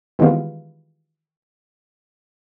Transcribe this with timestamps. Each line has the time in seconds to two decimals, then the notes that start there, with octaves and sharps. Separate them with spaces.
0.19 D#3 E3 G3 G#3 B3 F4